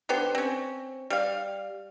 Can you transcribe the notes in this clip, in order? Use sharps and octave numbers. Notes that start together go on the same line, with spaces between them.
D3 B3 G4 C5
C4 C#4
G3 F5